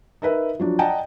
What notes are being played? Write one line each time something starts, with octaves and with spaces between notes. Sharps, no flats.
D#4 A#4 B4 E5
F3 F#3 D4
D5 D#5 F#5 G5 A5 A#5